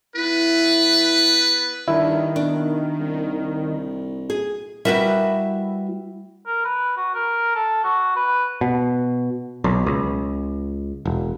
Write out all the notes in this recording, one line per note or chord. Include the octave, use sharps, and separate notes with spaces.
B3 E4 B4
G2 D#3 E4
B2 D4
C2
G#4
G3 E4 F#4 A#4 B4 E5
A#4
B4
F#4
A#4
A4
F#4
B4
B2
B1
C#2
E1